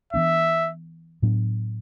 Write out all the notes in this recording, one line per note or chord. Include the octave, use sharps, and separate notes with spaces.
E3 B3 D4 E5
A2 F#3 B3 D4